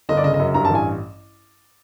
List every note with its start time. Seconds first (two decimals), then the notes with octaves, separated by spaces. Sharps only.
0.09 G1 D#5
0.17 D5
0.24 C#3 D#5
0.34 D#5
0.40 F#2
0.54 G2 A#5
0.65 A5
0.70 A1
0.75 G#5